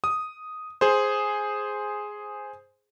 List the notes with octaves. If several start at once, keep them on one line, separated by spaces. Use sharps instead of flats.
D#6
G#4 C5